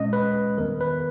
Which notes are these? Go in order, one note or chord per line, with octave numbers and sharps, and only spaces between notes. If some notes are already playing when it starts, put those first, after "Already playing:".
Already playing: A#2 G#3 C#4 D#5
B4
E2 D#3 G3 B3 A#4
B4